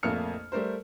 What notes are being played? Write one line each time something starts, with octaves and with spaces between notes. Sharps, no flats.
A#1 F2 A3 A#3 F6 C#7
G3 A3 A#4 C5